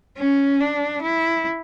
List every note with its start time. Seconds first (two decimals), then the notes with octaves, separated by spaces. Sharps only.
0.18 C#4
0.60 D4
1.02 E4